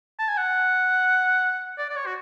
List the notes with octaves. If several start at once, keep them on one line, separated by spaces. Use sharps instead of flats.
A5
G#5
F#5
D5
D5
C#5
F#4